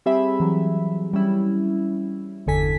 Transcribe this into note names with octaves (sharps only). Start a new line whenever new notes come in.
G3 C4 G4 G#4 E5 B5
E3 F#3
G3 C#4 E4
G1 E2 D3 A4 G#5 B6